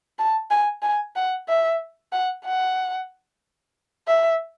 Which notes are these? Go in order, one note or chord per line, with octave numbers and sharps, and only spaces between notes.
A5
G#5
G#5
F#5
E5
F#5
F#5
E5